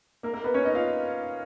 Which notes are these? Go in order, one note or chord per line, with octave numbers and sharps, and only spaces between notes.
A#3 A#4
A#3 A#4
B3 B4
C#4 C#5
D#4 D#5
F4 F5